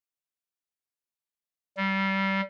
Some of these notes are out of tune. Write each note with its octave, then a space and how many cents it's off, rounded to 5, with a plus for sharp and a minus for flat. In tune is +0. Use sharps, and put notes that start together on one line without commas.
G3 -20